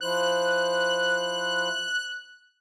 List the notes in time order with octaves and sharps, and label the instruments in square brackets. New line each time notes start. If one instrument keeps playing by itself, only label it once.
[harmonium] F3 E4 C5 [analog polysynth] F#6